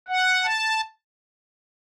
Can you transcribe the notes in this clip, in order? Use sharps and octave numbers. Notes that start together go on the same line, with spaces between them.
F#5
A5